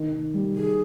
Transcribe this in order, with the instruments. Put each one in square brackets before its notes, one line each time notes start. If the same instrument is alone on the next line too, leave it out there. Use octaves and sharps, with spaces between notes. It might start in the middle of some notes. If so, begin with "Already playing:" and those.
Already playing: [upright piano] D#3
D#3
G3
[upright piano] D#3 [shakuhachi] G#4